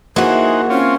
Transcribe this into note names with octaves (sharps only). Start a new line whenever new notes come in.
E3 A#3 D#4 F#4 G#4 C5 F#5
C4 C#4 F4 C#5